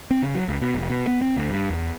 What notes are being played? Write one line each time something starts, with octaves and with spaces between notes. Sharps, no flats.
C4
C#3
F#3
C#2
B2
F1
B2
B3
C4
D2
G2
E2